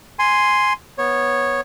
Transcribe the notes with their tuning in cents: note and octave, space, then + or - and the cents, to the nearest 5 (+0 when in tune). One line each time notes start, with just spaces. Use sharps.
G#5 +0 C6 +0
B3 -10 C#5 -10